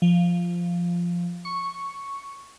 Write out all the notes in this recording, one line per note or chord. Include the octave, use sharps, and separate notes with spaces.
F3
C#6